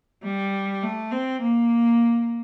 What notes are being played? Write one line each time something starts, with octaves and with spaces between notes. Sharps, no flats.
G3
A3
C4
A#3